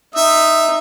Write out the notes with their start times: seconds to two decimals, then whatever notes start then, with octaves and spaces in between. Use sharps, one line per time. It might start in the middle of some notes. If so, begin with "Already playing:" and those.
0.16 D#4 E5